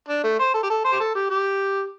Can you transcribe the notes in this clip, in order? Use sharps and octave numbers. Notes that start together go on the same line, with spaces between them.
D4
A3
C5
A4
G4
A4
C5
G4
A4
G4
G4